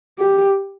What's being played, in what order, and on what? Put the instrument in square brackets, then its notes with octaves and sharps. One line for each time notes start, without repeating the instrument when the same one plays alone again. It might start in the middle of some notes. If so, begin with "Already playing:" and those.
[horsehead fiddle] G4